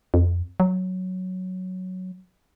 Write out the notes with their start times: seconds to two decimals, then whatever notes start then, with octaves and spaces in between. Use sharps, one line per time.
0.14 F2
0.60 F#3